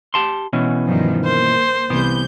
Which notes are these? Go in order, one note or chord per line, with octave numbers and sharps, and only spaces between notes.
G4 A5 C6
B2 E3 C#4
G2 D#3 F3
A#3 C5
C2 E3 B3 G6